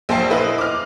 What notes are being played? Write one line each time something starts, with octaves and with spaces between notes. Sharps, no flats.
A#1 C5 G5 A5 C7
E4 B4 C5 D#5
D6 F6